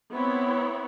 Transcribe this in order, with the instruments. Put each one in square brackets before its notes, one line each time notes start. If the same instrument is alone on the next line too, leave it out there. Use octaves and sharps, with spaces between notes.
[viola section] B3 C4 E4 C#5 B5